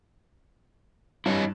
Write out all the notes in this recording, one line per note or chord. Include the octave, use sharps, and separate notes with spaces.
G2 E4 C#5 D#5